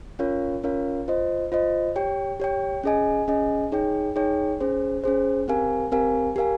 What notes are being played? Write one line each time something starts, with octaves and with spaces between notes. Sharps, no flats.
C#4 F4 A#4 C#5 F5
C#4 F4 A#4 C#5 F5
F4 C5 D#5
F4 C5 D#5
G4 C#5 G5
G4 C#5 G5
C#4 G#4 D#5 G#5
C#4 G#4 D#5 G#5
D#4 G#4 C#5 G5
D#4 G#4 C#5 G5
C#4 G#4 C5
C#4 G#4 C5
C4 G4 A#4 F5 G#5
C4 G4 A#4 F5 G#5
G4 A#4 F5 G#5